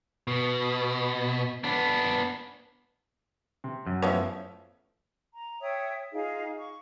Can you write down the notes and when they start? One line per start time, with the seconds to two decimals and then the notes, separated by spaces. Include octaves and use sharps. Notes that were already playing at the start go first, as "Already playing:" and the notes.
0.28 B2
1.64 B3 D4
3.64 C3
3.87 F#2
4.02 A1 F3 B3 C#5 E5
5.33 A#5
5.61 C#5 E5 G5 D#6
6.13 D#4 F4 G#4 F5
6.58 C#6